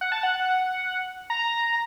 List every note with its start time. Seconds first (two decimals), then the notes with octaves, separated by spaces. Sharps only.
0.01 F#5
0.12 A5
0.23 F#5
1.30 A#5